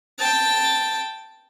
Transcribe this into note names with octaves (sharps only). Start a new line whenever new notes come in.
G5 A5